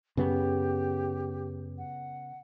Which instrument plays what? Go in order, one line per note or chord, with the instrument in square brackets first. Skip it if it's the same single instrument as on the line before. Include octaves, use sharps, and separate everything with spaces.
[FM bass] F#2 [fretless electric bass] C#3 B3 [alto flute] G4
[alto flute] F#5